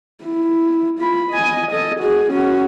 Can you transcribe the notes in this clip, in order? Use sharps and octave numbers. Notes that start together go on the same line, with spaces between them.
E4
F4 B5
D#5 G#5
A4 D#5
F#4 G#4
C#4 F#4